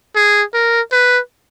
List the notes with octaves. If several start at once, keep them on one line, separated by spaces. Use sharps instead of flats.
G#4
A#4
B4